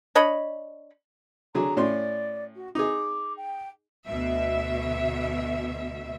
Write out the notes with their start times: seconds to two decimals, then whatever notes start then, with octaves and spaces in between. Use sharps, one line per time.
0.15 D4 C#5 D#5 B5
1.55 D3 F#3 G#4 A#5
1.77 A2 C#4 D5 C6
2.55 F#4
2.75 D#4 G#4 D6
3.37 G5
4.06 D2 B2 E5